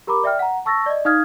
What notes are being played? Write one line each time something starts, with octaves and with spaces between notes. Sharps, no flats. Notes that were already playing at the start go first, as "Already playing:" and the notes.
G4 A#4 A#5 B5 D6
D5 E5 G5 F6
F#5 A#5
A5 C#6 E6 A6 A#6
D5 D#5
D#4 F5 D#6 F6 G#6